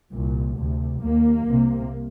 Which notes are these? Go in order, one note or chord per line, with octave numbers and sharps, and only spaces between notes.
C2 A#2
D2 C3
D#2 A#3
C2 C3